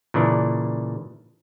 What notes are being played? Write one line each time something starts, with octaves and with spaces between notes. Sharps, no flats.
A#2 C#3 E3 D4